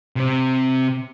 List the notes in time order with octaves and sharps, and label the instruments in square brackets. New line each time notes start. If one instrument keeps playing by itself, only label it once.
[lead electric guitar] C3 C4